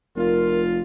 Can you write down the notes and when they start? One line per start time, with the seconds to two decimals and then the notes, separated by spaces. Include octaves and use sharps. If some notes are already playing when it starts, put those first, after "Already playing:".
0.16 F1 F4 A#4